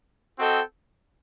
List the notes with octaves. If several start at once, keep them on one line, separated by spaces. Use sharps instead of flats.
C4 F#4 A4 D#5 G5